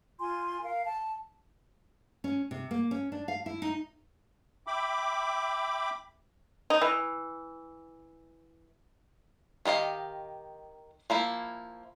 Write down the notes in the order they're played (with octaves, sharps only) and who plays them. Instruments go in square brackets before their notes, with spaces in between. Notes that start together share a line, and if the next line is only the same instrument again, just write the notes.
[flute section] F4 G#5 C6
A#4 F5
A5
[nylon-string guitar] C#4
C3
A#3
C#4
D4
F5
E4
D#4
[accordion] E5 G5 B5 D6
[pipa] D#4
E3
[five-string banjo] D#3 G4 D#5 F5
F3 A#3 E4